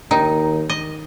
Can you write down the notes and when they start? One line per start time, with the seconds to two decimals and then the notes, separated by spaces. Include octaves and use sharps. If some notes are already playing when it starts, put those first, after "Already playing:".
0.11 D#2 D#3 D#4
0.70 D#5